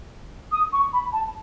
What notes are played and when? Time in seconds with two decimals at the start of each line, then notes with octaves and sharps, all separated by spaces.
0.51 D#6
0.72 C#6
0.93 B5
1.12 A5